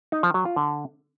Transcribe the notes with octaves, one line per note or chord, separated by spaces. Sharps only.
D#4
F3
F#3
F4
D3